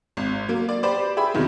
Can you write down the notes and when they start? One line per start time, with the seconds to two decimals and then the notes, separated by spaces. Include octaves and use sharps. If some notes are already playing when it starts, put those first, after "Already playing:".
0.17 G#1
0.48 F#3 A#3
0.69 D5
0.83 G4 B4 C5 D5
1.17 G#4 E5 G5 B5
1.34 E2 C3 D#3 F#3